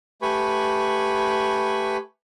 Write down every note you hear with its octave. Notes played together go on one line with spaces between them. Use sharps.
A3 G4 B4 G#5 B5 C#6